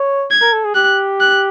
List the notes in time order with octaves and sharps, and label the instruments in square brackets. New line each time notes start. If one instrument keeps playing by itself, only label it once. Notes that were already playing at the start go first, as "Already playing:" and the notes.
Already playing: [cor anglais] C#5
[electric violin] G#6
[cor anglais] A#4
A4
G#4
[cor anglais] G4 [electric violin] F#6
[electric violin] F#6